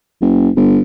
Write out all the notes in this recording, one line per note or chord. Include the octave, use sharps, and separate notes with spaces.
F#1
G1